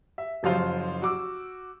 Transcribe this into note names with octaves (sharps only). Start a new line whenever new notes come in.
E5
F#1 F3 F#3 F4 C5
F#4 D6 E6